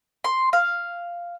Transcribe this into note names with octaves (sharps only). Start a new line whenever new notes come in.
C6
F5